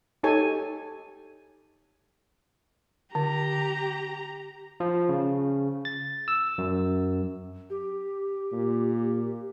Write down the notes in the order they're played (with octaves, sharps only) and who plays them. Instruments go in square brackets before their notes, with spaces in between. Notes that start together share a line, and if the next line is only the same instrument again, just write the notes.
[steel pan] D#4 G4 A4 C#5 G#5
[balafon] D3 [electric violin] G4 A#5
[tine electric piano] F3
C#3
A6
E6
F#2
[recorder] G4
[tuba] A#2